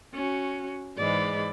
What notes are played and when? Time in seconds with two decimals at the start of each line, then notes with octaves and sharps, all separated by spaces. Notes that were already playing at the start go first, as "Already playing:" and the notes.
0.14 C#4 F#4
0.97 G#2 E3 G#3 D5 B5